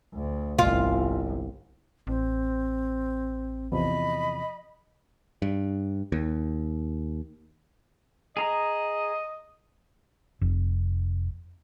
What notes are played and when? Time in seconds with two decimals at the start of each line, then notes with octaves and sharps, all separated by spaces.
0.13 D2
0.59 G1 C2 F4
2.07 A1 C4
3.72 E2 C3 F3 D#5 B5
5.42 G2
6.12 D#2
8.37 G#4 D#5 A#5
10.41 F1